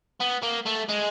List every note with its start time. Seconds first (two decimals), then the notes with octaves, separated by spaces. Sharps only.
0.20 B3
0.42 A#3
0.66 A3
0.89 G#3